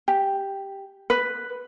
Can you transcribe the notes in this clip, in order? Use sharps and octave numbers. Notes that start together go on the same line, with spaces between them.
G4
B4